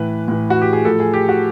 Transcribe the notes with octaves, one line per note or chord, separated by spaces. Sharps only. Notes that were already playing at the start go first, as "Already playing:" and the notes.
Already playing: A2 E3 B4
A2 E3
F#4
G4
G#4
A2 F3 A4
G#4
G4
F#4